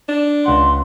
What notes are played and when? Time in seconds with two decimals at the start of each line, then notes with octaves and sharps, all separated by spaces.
0.09 D4
0.46 C#2 F#5 C6